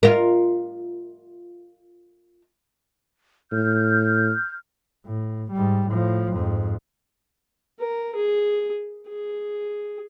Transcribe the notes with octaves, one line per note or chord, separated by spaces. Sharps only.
F4 A#4
A2 F6 G6
A2
G#2 G3
A2 F3
F2 G#2
A#4
G#4
G#4